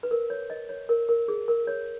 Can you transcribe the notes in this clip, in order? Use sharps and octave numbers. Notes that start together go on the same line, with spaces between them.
B4
A#4
C#5
D#5
C#5
A#4
A#4
G#4
A#4
C#5